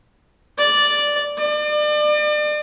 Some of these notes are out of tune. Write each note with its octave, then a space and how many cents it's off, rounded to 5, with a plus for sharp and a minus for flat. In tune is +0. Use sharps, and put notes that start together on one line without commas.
D5 -5
D5 +35